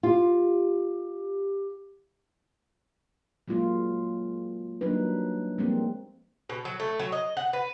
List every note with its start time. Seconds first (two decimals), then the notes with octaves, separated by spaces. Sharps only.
0.03 F4 G4
3.48 F#3 G#3 A#3 F4
4.81 F#3 G3 A#3 D4 D#4 B4
5.58 F3 G3 G#3 A#3 C4
6.49 B2
6.65 F#3
6.80 A3
6.99 F#3
7.12 D#5
7.37 F#5
7.53 B4